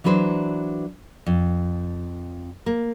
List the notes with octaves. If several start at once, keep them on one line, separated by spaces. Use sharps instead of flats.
E3 F#3 D4 B4 C5
F2
A#3